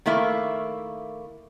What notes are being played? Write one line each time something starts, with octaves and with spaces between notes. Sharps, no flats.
D#3 A3 A#3 E4